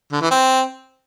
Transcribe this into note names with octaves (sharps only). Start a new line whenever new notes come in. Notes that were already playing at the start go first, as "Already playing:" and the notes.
D3
E3
C4